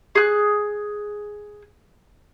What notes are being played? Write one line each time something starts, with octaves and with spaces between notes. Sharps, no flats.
G#4 F#6